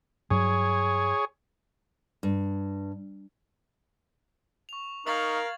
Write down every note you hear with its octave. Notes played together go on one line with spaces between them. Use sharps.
G2 F#3 G#4 C#5
G2
C#6 F7
D#4 A#4 F5 C#6 G#6 A6 F#7